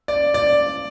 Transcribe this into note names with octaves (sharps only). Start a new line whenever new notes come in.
D5
D5